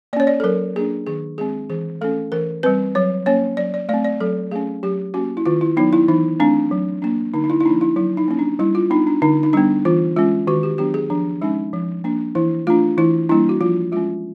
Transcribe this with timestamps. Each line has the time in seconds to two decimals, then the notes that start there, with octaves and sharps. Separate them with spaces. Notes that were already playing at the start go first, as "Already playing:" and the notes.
0.13 A#3 D5
0.17 C#4 C#5
0.27 D5
0.40 A4
0.44 F#3 A#4
0.76 A#3 D4 G#4
1.07 D#3 G#4
1.38 G#3 C4 G#4
1.70 E3 G#4
2.01 A3 C#4 A4
2.32 E3 A#4
2.63 G3 C4 B4
2.95 F#3 C#5
3.26 A#3 C#4 C#5
3.57 F#3 D5
3.74 D5
3.89 A3 C4 D5
4.04 D5
4.20 F#3 A4
4.51 A3 C#4 G#4
4.83 F#3 G4
5.14 A#3 C#4 F#4
5.37 E4
5.46 D#3 F4
5.61 E4
5.77 F#3 B3 D#4
5.93 E4
6.08 E3 D#4
6.40 A3 C4 D4
6.71 F#3
7.02 A#3 D4
7.34 D3 D#4
7.44 D#4
7.50 E4
7.60 E4
7.65 F3 A#3 D4 D#4
7.81 E4
7.96 F#3 E4
8.17 D#4
8.28 A#3 C#4
8.39 D4
8.59 G3 E4
8.75 F4
8.90 B3 D4 D#4
9.07 D4
9.22 D3 D#4
9.43 D#4
9.53 G3 B3 D4
9.85 E3 F4
10.16 G#3 C#4 F4
10.47 D#3 F#4
10.63 G4
10.78 F#3 B3 D4 G4
10.94 G#4
11.10 F3 D4
11.42 G#3 C#4 D#4
11.73 F3
12.04 A#3 D4
12.35 E3 E4
12.67 A3 D4 F4
12.98 E3 E4
13.29 G3 A#3 D4 E4
13.49 F#4
13.61 F3 F4
13.92 G#3 C#4 F4